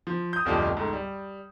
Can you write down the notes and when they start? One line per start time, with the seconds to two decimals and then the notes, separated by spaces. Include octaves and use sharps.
0.07 F3
0.33 D#6 G6
0.45 D1 G1 F2 G3 F4 G4
0.77 C#2 G#2 A3
0.93 G3